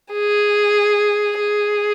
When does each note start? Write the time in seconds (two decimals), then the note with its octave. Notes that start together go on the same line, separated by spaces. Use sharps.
0.13 G#4
1.39 G#4